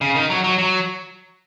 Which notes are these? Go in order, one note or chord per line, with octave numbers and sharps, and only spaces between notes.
C#3
D#3
F#3
F#3
F#3